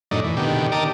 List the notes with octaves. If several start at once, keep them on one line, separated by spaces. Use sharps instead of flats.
F#2 A2 D4 D#4
E3
B2 D3 D#3 G4
G4 A#4 D5 D#5 A5